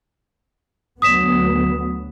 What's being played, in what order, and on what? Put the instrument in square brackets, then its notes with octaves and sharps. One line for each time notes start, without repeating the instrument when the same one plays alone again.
[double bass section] D2 F#3 B3 [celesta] D#6 B6 E7